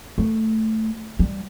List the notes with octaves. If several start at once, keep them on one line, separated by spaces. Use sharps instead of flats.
A3
G3